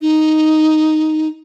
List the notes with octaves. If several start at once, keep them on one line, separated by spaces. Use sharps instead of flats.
D#4